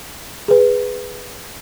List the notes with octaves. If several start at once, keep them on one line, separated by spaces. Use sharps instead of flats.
G#4 B4